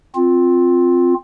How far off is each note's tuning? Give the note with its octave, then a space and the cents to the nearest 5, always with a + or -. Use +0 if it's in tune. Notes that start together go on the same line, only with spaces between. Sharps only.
C4 +0 F4 +10